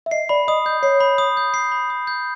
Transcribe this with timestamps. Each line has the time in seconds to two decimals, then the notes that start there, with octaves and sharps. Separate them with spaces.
0.06 E5
0.11 D#5 C7
0.29 D5 B5
0.48 D#5 D#6
0.66 D#5 G6
0.83 C#5 C7
1.00 B5
1.18 D#6
1.37 G6
1.54 C7
1.72 B5
1.90 D#6
2.07 G6